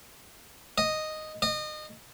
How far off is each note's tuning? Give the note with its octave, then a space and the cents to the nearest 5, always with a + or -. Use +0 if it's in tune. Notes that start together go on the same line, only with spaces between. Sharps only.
D#5 -5
D#5 -30